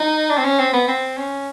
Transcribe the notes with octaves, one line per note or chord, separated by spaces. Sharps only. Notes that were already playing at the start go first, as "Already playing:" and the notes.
Already playing: D#4
D4
C4
C#4
C4
B3
C4
C#4